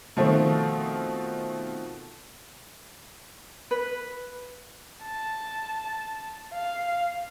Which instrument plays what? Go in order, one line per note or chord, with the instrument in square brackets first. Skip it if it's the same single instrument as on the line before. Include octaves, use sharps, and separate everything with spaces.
[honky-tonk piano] B2 D#3 F3 A3 C4
[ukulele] B4
[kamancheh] A5
F5